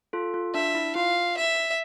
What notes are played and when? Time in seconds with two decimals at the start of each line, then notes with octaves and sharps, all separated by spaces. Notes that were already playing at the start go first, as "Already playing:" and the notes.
0.13 F4 A4
0.34 F4
0.54 D4 E5
0.75 E4
0.95 F4 F5
1.37 E5